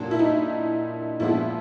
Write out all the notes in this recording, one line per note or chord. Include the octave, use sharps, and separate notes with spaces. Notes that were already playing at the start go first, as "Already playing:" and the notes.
Already playing: A#2 F#3 A#3 D4
E4
D#4
A#2 F3 G#3 B3 D4 E4